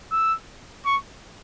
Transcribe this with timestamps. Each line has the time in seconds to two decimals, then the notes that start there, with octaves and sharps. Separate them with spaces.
0.12 E6
0.85 C#6